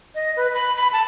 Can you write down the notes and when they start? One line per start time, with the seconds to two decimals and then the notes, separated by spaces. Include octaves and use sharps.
0.15 D#5
0.37 B4
0.54 B5
0.76 B5
0.93 A5